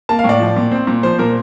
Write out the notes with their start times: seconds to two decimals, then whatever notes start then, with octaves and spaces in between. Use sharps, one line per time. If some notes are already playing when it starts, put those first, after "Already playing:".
0.09 A#3 A5
0.19 F5
0.24 A2
0.29 D5
0.40 F3
0.56 A#2
0.72 C4
0.87 A#2
1.03 F3 C5
1.19 A#2 A#4